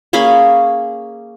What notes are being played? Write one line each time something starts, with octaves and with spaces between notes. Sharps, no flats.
A#3 C#4 G#4 B5